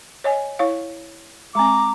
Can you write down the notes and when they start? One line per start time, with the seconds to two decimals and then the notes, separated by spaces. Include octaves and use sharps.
0.24 C#5 D#5 G#5
0.59 E4 C#5 F5
1.55 G#3 C4 A#5 D6